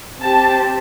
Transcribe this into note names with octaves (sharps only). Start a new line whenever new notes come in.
C4 G4 A5